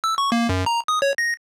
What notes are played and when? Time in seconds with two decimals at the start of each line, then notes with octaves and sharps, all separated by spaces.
0.04 E6
0.18 C#6
0.32 A#3
0.49 F#2
0.66 A#5
0.88 D#6
1.02 C#5
1.18 A#6